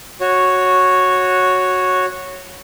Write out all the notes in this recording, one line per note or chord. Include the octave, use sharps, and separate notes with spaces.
F#4 C#5